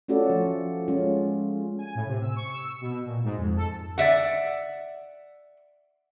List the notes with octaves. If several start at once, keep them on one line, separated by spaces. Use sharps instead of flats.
A3 C#4 F4 F#4 A4 D5
F3
G#3 C#4 F4
G#5
A2
C3
E6
C#6
E6
B2
A#2
G#2
F2
A4
D5 E5 F#5